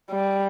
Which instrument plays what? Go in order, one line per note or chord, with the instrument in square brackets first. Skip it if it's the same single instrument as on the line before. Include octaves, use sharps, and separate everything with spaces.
[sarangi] G3